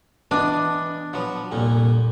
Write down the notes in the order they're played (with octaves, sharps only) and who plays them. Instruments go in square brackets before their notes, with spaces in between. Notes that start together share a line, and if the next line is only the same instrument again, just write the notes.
[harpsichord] E3 B3 D#5 [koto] D4
[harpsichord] F3 F#3 B3
C2 F2 A#2